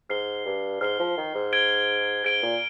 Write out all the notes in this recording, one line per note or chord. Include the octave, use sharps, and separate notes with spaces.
G#2 F6 C7 G7
G2
G#2 F6 C7 G7
F3
D#3
G#2
G#6 D7 G7
G#2 G#6 D7 G7
A#2